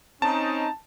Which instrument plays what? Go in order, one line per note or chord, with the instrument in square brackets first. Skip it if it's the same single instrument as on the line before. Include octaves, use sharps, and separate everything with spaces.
[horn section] C4 C#4 D#4 [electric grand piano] A5